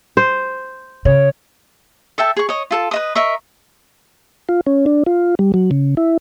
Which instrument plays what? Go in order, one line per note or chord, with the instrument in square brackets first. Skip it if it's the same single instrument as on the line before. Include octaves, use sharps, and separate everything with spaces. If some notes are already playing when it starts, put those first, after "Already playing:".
[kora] C5
[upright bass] C#3 [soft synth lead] C#5
[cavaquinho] A4 E5 G5 A5
G#4 C#6
C#5 D#5
F4 A4 A5
B4 D#5 D#6
A#4 D#5 E5 C#6
[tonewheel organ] F4
C#4
D4
F4
G3
F#3
C#3
E4